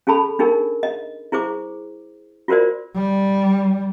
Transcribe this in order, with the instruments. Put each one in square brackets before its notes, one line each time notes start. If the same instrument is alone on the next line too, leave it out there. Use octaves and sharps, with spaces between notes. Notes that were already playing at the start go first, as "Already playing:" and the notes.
[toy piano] C#4 G#4 A4 A5 B5
D4 D#4 G#4 A#4
D#5
E4 G#4 C5 D6
F4 F#4 A#4 C5 D5
[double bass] G3